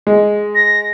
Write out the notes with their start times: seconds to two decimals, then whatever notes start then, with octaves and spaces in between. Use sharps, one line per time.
0.07 G#3
0.55 A#6